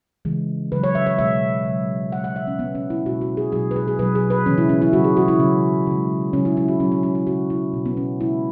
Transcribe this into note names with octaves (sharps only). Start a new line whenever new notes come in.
C#3 E3 G#3
C#3 F#3 B4
C#5
E5
C#5
B2 G#3 E5
C#3 F#3
B2 G#3 F#5
F#5
E5
C#4
B2 G#3 B3
C#4
E4
B2 G#3 F#4
F#4
G#4
B2 F#3 G#4
B4
G#4
G#4
B2 F#3 B4
G#4
B4
C#3 E3 G#3 C#4
E4
C#4
E4
C#3 F#3 F#4
G#4
F#4
E4
C#3 F#3 C#4
C#3 G#3
C#3 F#3 C#4
E4
E4
F#4
B2 F#3 C#4
C#4
C#4
E4
C#3 F#3 F#4
E4
B2 G#3
B3
C#4
C#3 G#3 E4